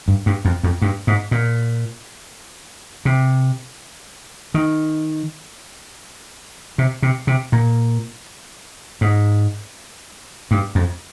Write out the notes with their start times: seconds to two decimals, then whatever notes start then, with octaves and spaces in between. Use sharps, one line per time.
0.08 G2
0.26 G2
0.45 F2
0.63 F2
0.82 G2
1.07 G#2
1.31 A#2
3.05 C3
4.54 D#3
6.78 C3
7.03 C3
7.27 C3
7.52 A#2
9.01 G#2
10.51 G2
10.75 F2